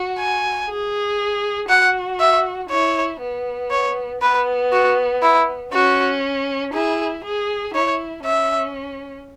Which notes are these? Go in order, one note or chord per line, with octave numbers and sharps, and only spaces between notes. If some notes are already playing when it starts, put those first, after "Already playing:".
Already playing: F#4
G#5
G#4
F#4 F#5
E5
E4 C#5
B3
C#5
B3 B4
F#4
E4
C#4 F#4
E4 G#4
G#4
E4 C#5
C#4 E5